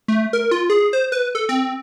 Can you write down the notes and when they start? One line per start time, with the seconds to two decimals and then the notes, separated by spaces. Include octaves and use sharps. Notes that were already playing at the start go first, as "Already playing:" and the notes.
0.08 A3
0.33 A#4
0.51 F4
0.70 G#4
0.93 C5
1.12 B4
1.35 A4
1.49 C4